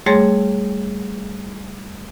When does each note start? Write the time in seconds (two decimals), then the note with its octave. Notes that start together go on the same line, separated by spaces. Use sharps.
0.06 G3 A3 G#4 C#5 C6 A6